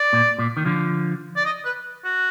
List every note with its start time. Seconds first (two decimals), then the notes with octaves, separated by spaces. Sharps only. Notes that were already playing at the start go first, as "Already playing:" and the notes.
Already playing: D5
0.13 A#2
0.39 A#2
0.57 D#3
0.65 D3 F3
1.36 D5
1.45 D#5
1.65 B4
2.05 F#4